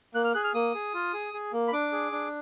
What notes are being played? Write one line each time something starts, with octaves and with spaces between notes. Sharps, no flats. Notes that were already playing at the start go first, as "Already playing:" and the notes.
A#3 F#6
F6
G#4 F#6
F6
A#3 D#6
G#4
F4
G#4
G#4
A#3
B5
D4 D6
G#4
D4